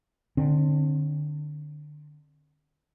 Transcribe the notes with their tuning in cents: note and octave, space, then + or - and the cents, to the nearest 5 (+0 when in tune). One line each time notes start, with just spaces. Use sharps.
D3 +25 C4 +40